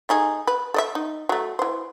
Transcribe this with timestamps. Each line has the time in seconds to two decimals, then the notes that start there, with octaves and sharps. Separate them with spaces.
0.09 A3 D#4 G#4
0.47 B4
0.74 A4 D#5 E5
0.95 D#4
1.29 F#3 A3
1.59 E3 C5